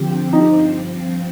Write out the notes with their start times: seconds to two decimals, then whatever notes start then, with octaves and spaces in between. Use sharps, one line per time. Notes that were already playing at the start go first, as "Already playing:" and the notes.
Already playing: D3 F3 C4 G4
0.32 G2 F3 C4 D#4